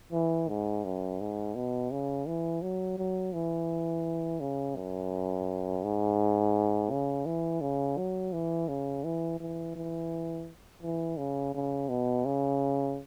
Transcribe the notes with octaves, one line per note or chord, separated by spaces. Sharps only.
E3
G#2
F#2
G#2
B2
C#3
E3
F#3
F#3
E3
C#3
F#2
G#2
C#3
E3
C#3
F#3
E3
C#3
E3
E3
E3
E3
C#3
C#3
B2
C#3